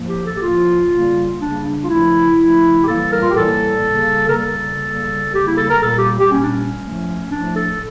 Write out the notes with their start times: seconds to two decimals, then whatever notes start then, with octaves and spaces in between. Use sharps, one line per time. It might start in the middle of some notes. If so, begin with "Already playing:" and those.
Already playing: A2 F3 A#3
0.08 G4
0.25 A4
0.36 G4
0.41 A2 F3 A#3 F4
0.90 C#3 G3 A#3
1.39 C#3 G3 A#3 D4
1.64 D4
1.84 F4
1.89 C#3 F3 A3 E4
2.38 C#3 F3 A3
2.84 G4
2.87 A2 E3 G3 A#3 A4
3.12 A#4
3.22 F4
3.30 G4
3.36 A2 E3 G3 A#3 A4
3.86 C#3 G3 A#3
4.28 A#4
4.34 C#3 G3 A#3 A4
4.85 C#3 G3 A#3
5.34 C#3 G3 A#3 G4
5.46 E4
5.57 A4
5.69 A#4
5.82 A#2 G3 A#3 A4
5.95 G4
6.19 G4
6.31 A#2 G3 A#3 C#4
6.43 D4
6.56 C#4
6.81 A2 F3 A3
7.30 A2 F3 A3 D4
7.55 A4